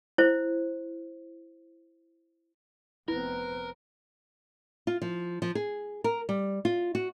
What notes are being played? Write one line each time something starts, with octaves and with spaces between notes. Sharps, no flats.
E4 C5
F1 B3 C4 E4 A#4 B4
F4
F3
F3
G#4
A#4
G3
F4
F#4